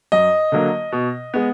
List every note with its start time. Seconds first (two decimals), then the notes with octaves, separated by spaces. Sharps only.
0.12 F#2 D#5
0.52 D3 F#3 A#3
0.92 B2
1.34 G#3 B3